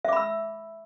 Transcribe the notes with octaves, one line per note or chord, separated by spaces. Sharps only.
E5 B5 D6 E6